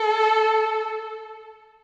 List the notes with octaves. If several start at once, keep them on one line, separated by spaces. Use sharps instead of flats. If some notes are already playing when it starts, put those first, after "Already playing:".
Already playing: A4